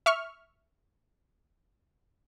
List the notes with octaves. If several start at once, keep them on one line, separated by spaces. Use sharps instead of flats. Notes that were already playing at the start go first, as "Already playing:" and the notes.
E5 C#6 F6